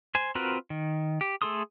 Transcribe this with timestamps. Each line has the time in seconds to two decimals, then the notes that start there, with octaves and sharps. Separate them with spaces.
0.15 C5 G#5
0.35 C4 F4 F#4 A#4 B4
0.70 D#3
1.21 G4
1.42 A3 G#4 A4 C6 D#6